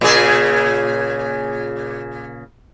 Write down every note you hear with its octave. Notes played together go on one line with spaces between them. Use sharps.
A#2 C#3 G#4